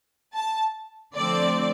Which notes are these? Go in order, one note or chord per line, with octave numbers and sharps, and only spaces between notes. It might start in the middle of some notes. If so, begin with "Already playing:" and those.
A5
D3 F3 A3 C4 D5